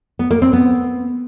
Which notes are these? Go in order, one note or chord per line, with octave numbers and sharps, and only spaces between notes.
B3
A#3
C4
B3